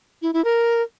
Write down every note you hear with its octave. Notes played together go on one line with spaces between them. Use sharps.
E4
E4
A#4